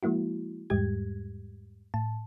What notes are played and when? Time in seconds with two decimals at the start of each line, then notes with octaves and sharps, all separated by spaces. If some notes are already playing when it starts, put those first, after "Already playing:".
0.03 F3 G#3 A#3 E4 F#4
0.70 E2 G#2 G3 G#3 G4 G#6
1.94 A2 A5